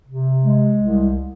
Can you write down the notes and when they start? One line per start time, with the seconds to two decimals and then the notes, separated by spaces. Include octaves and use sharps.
0.08 C3
0.43 G#3
0.78 C2